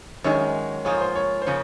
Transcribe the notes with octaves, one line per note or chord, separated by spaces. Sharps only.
F#2 D#3 G#3 C#5
G#2 F3 A#3 F4 G#4 C#5
C5
C#5
C5
C#3 F3 A#3 C#4 C#5